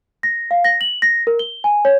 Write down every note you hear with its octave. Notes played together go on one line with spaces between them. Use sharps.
A#6
F5
A#6
F#7
A#6
A#4
G7
G#5
C#5